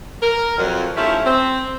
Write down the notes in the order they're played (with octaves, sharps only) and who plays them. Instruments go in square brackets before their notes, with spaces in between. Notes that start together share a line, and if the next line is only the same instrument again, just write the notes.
[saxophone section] A#4
F2 F#3
D#3 F3 A3 C#4 E4 G4
C4